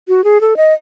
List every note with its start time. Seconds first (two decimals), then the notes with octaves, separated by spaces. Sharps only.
0.08 F#4
0.24 G#4
0.41 A4
0.57 D#5